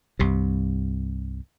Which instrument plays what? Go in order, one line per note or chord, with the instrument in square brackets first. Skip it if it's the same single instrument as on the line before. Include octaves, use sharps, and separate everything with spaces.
[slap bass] C2 G2 C3